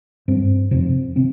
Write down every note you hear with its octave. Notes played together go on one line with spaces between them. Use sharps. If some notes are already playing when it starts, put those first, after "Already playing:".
G2 C4
F2 C3 C4
C3 C4